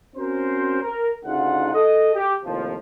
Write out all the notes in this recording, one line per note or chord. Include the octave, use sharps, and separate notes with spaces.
C4 C#4 F#4 A#4 C5
A#4
D2 C#3 D#4 F4 F#5
A4 D#5
G4
D#2 A2 C3 F3